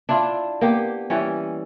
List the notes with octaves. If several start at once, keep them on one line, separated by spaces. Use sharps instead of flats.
D4 E4 F4
A#3 B3 G4
E3 G3 C#4